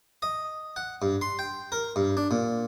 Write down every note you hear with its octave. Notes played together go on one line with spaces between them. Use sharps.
D#5
F#5
G2
C6
G5
A#4
G2
D4
A#2